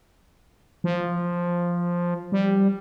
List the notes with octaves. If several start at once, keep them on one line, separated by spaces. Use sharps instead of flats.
F3
G3